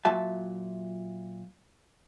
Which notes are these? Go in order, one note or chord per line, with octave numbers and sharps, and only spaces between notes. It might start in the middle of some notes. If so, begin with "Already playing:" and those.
A#2 F#3 F4 F#4 E5 A5